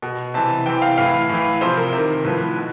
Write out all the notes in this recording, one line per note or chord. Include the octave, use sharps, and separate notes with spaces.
B2
C3 E3 A5
C3 E3 G5
F5
A2 E3 F5
A2 E3
C3 F3 C5
A#4
C3 D#3
A2 F3 B4
B2